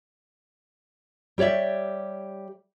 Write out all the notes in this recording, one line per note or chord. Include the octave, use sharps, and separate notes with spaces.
G3 G4 C#5 D5 E5